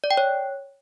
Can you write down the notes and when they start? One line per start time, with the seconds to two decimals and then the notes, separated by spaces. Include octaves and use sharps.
0.04 D5
0.11 G5
0.17 C#5